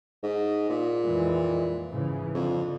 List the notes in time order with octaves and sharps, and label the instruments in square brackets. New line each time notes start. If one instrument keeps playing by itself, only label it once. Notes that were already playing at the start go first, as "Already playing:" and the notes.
[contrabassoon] G#2
A#2
[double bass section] F2 E3 G#3
G#2 C#3 E3
[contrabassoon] F2 [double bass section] D3